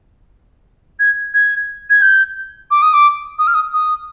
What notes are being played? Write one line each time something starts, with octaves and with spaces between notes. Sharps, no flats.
G#6
G#6
G#6
G6
D6
D#6
D6
D#6
F6
D#6
D#6